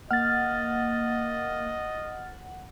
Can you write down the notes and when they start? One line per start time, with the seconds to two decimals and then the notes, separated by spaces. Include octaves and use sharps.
0.11 A#3 D#5 F#5 F6 A6